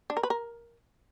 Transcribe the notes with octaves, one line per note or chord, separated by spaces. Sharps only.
D4
A#4
B4
A#4